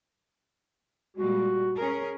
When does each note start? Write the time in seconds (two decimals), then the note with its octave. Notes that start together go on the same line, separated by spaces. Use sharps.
1.17 A#2 G3 G#3 F#4
1.76 C#4 G#4 A#4